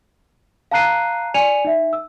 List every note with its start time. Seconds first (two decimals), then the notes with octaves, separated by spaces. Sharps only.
0.71 F5 A5 A#5 F#6 C7 D#7
1.34 D5 G#5 C#7 D#7 F7
1.65 D#4 E5
1.93 E6